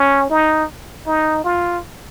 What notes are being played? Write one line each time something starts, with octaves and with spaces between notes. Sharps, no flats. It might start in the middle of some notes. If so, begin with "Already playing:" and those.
Already playing: C#4
D#4
D#4
F4